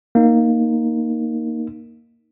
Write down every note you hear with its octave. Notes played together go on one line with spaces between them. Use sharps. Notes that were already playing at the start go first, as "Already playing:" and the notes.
A#3 D#4